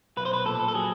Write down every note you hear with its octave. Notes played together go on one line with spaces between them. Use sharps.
B1 B4
C5
B4
A#2 A4
A4
F#3 G#4